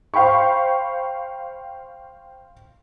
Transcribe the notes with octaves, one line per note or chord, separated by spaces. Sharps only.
C5 F5 G5 B5 C#6